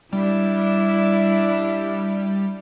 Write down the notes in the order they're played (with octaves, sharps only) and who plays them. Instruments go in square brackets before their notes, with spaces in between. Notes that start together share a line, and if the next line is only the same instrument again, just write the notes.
[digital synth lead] G3 [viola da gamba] D4 E4